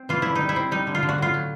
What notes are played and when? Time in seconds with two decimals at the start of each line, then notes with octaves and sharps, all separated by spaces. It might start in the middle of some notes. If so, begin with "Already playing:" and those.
Already playing: C4
0.09 E3 F4
0.22 D3 E4
0.35 D#4
0.41 G3
0.49 E4
0.56 C4
0.71 G3 D#4
0.87 D3
0.95 F4
1.03 D3
1.09 F#4
1.18 A2 F4
1.34 F#3